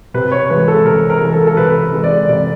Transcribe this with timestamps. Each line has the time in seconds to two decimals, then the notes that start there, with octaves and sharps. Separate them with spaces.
0.14 C3 B4
0.32 C#5
0.50 E3 G#3 B4
0.68 A4
0.85 C3 A#4
1.10 A#4
1.21 E3 G#3
1.33 A4
1.47 A4
1.56 C3 B4
1.93 E3 G#3
2.04 D5
2.28 C3 D5